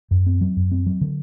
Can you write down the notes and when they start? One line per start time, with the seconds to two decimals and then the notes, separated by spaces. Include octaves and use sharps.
0.11 F#2
0.27 C4
0.41 F#3
0.57 F#2
0.71 C4
0.86 F#3
1.01 D3